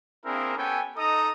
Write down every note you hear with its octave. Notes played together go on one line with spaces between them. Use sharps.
A#3 C4 D4 E4 G#4 A#4
B3 C#4 G4 A4 G5 G#5
D#4 A4 D#5 A#5 D#6